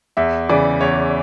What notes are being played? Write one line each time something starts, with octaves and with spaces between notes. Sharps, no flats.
E2 E5
C#3 E3 D5
E2 C#5